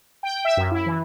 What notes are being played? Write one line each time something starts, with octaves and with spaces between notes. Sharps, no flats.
G5
E5
F#2
E4
E3